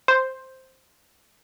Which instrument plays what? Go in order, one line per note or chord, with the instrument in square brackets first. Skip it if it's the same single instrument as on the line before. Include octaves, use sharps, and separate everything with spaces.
[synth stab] C5